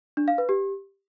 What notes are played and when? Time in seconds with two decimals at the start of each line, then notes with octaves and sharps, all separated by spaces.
0.17 D4
0.28 F5
0.38 B4
0.49 G4